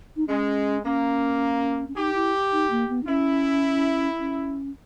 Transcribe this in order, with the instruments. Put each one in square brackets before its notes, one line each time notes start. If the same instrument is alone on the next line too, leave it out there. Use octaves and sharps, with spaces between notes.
[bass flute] D#4
[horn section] G#3 [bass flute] C#4
[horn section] A#3 [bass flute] C#4
[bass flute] C#4
[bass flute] D#4 [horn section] G4
[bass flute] E4
D#4
A#3
B3
D#4
[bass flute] C#4 [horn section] E4
[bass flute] C#4